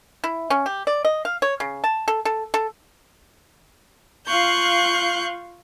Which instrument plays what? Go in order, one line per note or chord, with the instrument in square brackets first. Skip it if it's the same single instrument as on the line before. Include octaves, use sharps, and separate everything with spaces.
[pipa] E4
C#4
G4
D5
D#5
F5
C#5
C#3
A5
A4
A4
A4
[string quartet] F4 F5 C#6 F#6 G6